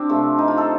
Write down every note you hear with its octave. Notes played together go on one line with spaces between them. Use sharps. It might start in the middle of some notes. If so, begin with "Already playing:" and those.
Already playing: C4 D4 G4
C3 F3 A3
D#4
F4
A4